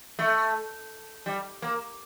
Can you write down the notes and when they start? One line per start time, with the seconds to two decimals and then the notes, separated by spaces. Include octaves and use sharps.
0.19 A3
1.26 G3
1.62 A#3